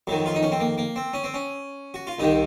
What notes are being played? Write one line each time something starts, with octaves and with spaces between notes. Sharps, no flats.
F2 D#3 F#3
F4
D#4
C#4
C4
A#3
A#3
C4
C#4
C4
C#4
F#4
F4
C2 C3 D#3 D#4